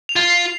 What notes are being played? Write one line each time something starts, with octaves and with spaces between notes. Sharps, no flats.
F7
F4
C7